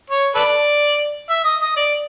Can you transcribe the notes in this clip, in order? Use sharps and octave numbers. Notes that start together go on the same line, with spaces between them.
C#5
A4 B4 D5
E5
D#5
D#5
D5